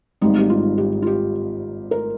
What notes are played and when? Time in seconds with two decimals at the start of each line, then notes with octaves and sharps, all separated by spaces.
0.21 G#1 G#2 G3 D#4
0.38 G4
0.50 F4
0.78 G4
1.02 F4
1.07 G4
1.91 A#4